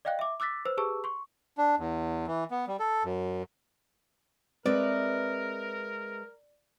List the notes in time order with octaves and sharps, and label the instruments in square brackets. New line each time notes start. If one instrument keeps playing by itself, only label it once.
[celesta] D5 D#5 F5 G5 F#6
E5 D6
D6 E6 F#6 A6 B6
B4 C5 E6
G4 G#4 B4 A5 C#6 E6
C6 C#6
[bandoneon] D4
E2
E3
B3
G3
A4
F#2
[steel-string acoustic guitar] G#3 B4 E5 [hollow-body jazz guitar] C4 [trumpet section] A#4 [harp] D5